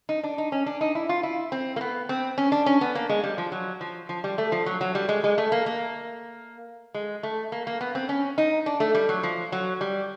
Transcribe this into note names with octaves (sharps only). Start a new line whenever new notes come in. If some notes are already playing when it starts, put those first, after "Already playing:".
D#4
D4
D#4
C#4
D4
D#4
E4
F4
E4
C4
A#3
B3
C4
C#4
D4
C#4
B3
A#3
G#3
G3
F3
F#3
F3
F3
G3
A3
F3
F#3
F#3
G3
G#3
G#3
A3
A#3
A#3
G#3
A3
A#3
A#3
B3
C4
C#4
D#4
D4
A3
G3
F#3
F3
F#3
G3